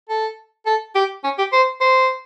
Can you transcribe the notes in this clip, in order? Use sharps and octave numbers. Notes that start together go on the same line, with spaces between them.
A4
A4
G4
C#4
G4
C5
C5